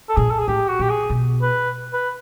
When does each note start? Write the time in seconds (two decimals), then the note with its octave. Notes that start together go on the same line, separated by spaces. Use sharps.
0.09 A4
0.16 A#2 G#4
0.30 A4
0.39 G#4
0.48 A2 G4
0.69 F#4
0.79 A#2 G4
0.90 G#4
1.10 B2
1.42 B4
1.93 B4